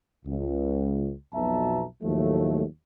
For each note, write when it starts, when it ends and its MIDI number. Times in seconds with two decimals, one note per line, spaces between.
0.26 1.12 37
1.33 1.84 35
1.33 1.84 41
1.33 1.84 47
1.33 1.84 76
1.33 1.84 81
1.33 1.84 82
2.03 2.64 39
2.03 2.64 45
2.03 2.64 53
2.03 2.64 54
2.03 2.64 57